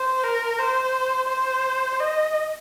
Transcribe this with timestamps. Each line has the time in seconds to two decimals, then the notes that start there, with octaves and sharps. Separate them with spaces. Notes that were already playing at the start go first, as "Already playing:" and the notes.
Already playing: C5
0.23 A#4
0.59 C5
1.29 C5
2.00 D#5